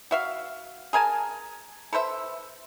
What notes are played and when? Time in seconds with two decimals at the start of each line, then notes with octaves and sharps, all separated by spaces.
0.11 F#4 E5 F5
0.93 G#4 A#4 G#5 A5
1.93 A4 B4 C5 E5